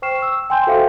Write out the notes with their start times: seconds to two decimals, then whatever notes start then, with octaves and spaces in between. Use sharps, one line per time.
0.02 C5 G5 C#6 F6 C7 E7
0.22 E6
0.50 G5 G#5 C6 G6
0.67 F#4 A4 C5 E5 F5 G5